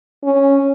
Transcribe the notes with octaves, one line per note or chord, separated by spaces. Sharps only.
C#4